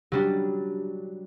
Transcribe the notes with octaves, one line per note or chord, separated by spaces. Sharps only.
F#3 G3 D4